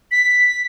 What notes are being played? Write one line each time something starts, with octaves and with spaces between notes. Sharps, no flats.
B6